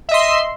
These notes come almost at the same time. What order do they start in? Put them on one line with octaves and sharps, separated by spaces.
E5 D#5 C6